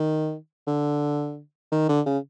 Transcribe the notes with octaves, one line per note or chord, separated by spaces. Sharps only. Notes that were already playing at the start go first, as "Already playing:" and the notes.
Already playing: D#3
D3
D#3
D3
C#3